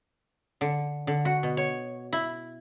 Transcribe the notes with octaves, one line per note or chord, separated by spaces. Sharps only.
D3
D3
F#4
B2
C#5
E4